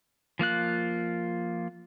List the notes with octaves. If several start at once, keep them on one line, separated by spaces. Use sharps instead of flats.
F3 A#3 F4 F#6